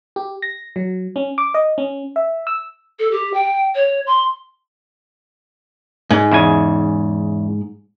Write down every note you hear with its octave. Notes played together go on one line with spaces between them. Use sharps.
G4
A#6
F#3
C#4
D6
D#5
C#4
E5
E6
A4
G4
G5
C#5
C6
G#2
E2 C#3 G#5